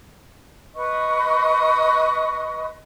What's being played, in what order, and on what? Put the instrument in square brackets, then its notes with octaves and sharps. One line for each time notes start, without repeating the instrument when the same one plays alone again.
[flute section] B4 D#5 C#6